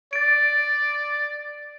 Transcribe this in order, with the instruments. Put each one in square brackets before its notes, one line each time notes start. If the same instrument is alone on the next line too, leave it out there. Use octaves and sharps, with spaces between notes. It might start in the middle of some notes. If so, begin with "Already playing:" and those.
[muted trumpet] D5 [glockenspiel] A6 D7